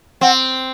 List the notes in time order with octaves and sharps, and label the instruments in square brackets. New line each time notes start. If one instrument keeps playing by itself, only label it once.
[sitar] C4 [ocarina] F#5